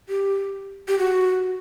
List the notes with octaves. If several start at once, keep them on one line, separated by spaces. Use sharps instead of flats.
G4
G4
F#4